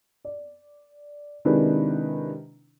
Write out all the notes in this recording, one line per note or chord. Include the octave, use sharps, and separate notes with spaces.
D5
C3 D#3 G#3 D4 E4 B4